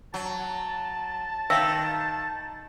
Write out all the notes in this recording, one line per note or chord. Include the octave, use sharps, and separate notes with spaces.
F#3 A5
D#3 E5 F5 G5 E6